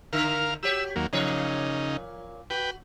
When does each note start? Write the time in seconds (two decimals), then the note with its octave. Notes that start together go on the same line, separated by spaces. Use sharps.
0.13 D3 A#4 F5
0.63 F#4 G4 C#5 E6
0.96 D#2 F#3 A#3
1.13 A#2 C#3 F3 D#4 C#5
2.50 F#4 B4 G5